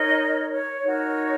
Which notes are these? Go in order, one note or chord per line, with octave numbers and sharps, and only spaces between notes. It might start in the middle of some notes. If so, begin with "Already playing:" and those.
Already playing: D#4 A#4 C#5 D#5
C#5
D#4 F#4 A#4 C#5